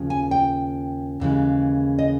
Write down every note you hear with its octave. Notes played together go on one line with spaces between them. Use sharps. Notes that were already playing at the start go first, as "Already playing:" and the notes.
Already playing: D#2 C#3 F3
G#5
G5
D#2 C#3 E3 G#3
D#5